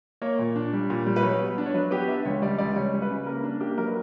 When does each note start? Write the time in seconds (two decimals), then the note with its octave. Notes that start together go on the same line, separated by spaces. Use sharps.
0.22 A#3 C#5
0.39 A#2
0.56 D4
0.73 G3
0.90 A#2
1.06 G3
1.16 B4
1.23 F#3 C#5
1.40 B3
1.58 D4
1.66 C#5
1.74 F#3 B4
1.91 B3 G4
2.08 D4 E5
2.25 C#2 C#5
2.42 G3 D5
2.58 C#2 D5
2.76 G3 C#5
2.94 G3
3.02 B4
3.10 C#3
3.26 A#3 A#4
3.43 D4
3.60 A#3 G4
3.78 F#3 A#4
3.87 B4